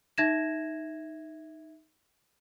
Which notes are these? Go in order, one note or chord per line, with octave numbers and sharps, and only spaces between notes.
D#4 E5 G#6 A#6 E7